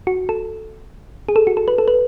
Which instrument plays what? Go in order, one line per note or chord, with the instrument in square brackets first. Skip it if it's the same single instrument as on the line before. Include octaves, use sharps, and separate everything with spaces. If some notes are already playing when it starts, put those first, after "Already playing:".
[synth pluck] F#4
A4
G#4
A4
F#4
A4
B4
A4
B4